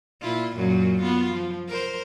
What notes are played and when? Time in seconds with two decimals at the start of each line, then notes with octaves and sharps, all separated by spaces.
0.22 A#2 E4 F4
0.56 F#2 A#2 F#3
1.02 B3 F4
1.32 F3
1.69 A#4 C5